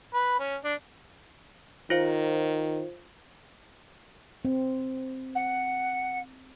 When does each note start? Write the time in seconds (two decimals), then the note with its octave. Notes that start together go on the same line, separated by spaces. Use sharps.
0.14 B4
0.40 C#4
0.64 D4
1.90 D#3 F4 C5 F5
4.45 C4
5.35 F#5